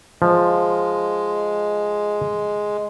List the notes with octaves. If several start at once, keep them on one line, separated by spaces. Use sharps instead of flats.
F3 G#3